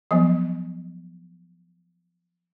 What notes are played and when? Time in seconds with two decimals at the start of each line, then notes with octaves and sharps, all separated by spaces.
0.11 F3 F#3 B3